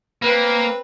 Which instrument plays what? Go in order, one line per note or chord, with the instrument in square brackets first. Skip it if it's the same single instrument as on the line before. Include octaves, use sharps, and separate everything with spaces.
[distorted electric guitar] A#3 [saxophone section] C4 B4